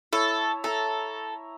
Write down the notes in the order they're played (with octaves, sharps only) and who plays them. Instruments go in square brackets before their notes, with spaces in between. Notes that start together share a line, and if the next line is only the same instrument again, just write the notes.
[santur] E4 C#5 E5 [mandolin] A4
[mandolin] A4 [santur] E5 A#5